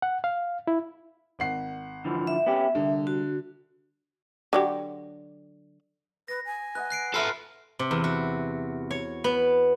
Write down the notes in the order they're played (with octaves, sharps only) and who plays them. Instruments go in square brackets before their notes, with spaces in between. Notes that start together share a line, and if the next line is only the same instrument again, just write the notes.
[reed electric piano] F#5
F5
E4
[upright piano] G#1 F#5 C7
[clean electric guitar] D3 E3 F3
[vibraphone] E5
[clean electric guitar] B3 C#4 G4
[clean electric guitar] C2 [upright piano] D3
[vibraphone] F#4
[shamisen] D3 F#3 G4
[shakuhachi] B4 [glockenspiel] A#6
[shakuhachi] G#5
[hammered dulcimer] B4 D#5 F#5 [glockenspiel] F#6
[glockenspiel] F#6 C7 D7
[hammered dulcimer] F4 E5 [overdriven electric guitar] A4 B4 [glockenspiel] F6 C7
[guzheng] C3
E2
F#4
C#5
B3